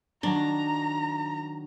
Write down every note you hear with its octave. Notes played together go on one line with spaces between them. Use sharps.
D#3 F#3 D4 A5 A#5